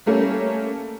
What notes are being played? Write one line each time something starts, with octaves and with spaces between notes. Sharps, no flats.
G3 A3 A#3 C#4